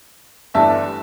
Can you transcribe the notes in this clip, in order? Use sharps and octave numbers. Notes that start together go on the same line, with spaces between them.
G1 G2 E3 A3 D4 E5 A5